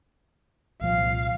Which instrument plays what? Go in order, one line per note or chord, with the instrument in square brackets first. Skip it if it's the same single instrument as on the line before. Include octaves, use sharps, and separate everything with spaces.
[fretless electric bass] C2 A#2 F3 [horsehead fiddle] F5